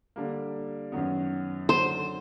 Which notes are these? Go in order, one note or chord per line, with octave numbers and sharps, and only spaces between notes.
D3 G3 A#3
F#2 D#3 F#3 B3
D3 F#3 C5